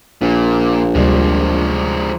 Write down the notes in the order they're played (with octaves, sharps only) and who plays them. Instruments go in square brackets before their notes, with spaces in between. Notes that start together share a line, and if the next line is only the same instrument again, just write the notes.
[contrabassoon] A#1 [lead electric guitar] A#2
[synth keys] D2 C3 G3 [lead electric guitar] F3 G#3